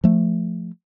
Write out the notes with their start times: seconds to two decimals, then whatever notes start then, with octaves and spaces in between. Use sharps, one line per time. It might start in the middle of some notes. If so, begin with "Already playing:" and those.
0.04 F3 A3